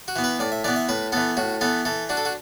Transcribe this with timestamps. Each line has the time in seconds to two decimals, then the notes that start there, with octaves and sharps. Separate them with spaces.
0.08 F#4
0.16 E3 B3
0.24 B4
0.39 A2 D5
0.52 E5
0.64 E3 D5
0.68 B3
0.76 E5
0.89 A2 B4
1.12 E3 B3 A4
1.37 A2 F#4
1.61 E3 B3 A4
1.85 E3 A4
2.09 D4 F#4
2.17 A4
2.25 F#4